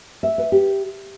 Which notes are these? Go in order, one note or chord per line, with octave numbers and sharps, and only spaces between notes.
E5
B4
G4